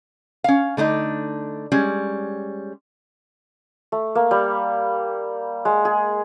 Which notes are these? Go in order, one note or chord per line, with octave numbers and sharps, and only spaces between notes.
C#4 F5
D3 A3 D4 D#4
G3 G#3 C#4
A3
A#3
G3
G#3
G#4